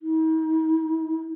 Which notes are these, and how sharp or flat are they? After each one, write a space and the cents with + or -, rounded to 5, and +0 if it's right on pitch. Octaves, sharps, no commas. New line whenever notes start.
D#4 +45